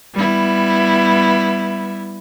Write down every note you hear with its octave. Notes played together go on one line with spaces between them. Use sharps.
G3 B3 E4